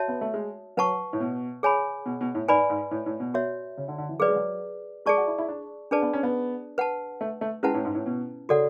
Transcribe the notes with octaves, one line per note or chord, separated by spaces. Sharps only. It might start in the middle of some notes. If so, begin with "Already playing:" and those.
Already playing: F#4 C#5 E5 A5
B3
A3
G#3
F#3 B4 F#5 A5 C#6
A2
B2
G#4 C#5 G#5 B5
B2
B2
A2
G#2 B4 D5 G#5 B5
G#2
A2
A2
B2
F#4 C#5 E5
C#3
D3
D3
E3
F#3 G#4 B4 D5
G#3
F#3
G#3 G#4 D5 A5 C#6
F#4
E4
E4
D4
D4 G#4 B4 D5 A5
B3
C#4
B3
B4 F#5 A5
A3
A3
G#3 C#4 E4 B4 F#5 A5
A2
G#2
A2
B2
C#3 F#4 A4 D5 F#5